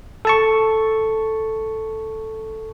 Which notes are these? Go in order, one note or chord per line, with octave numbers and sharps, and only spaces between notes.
A4 A5 C#6